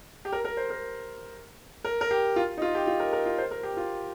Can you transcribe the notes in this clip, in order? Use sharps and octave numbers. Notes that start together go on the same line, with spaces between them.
G4
A#4
A#4
C5
A#4
A#4
A#4
G4
F4
D#4
F4
G4
F4
A#4
A#4
F4
C5
A#4
G4
F4